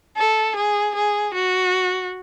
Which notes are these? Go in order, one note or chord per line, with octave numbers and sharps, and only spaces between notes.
A4
G#4
G#4
F#4